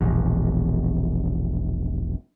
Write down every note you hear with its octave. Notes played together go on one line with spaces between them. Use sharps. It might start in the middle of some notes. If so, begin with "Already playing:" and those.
E1 A#1 E2